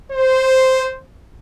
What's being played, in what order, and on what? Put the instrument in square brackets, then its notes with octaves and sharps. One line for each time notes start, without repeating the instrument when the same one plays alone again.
[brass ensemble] C5